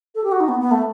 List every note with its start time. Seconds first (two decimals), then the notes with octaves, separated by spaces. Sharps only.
0.15 A4
0.24 G4
0.32 F#4
0.40 D#4
0.48 B3
0.60 B3
0.71 A3